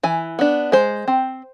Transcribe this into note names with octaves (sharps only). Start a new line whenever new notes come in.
E3 G#5
B3 D4
G#3 C5
C4